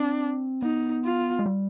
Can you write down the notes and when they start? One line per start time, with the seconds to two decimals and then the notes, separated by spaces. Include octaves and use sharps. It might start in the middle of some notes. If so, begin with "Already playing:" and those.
Already playing: C4 D4
0.62 B3 D#4
1.05 F4
1.39 G#3
1.46 G3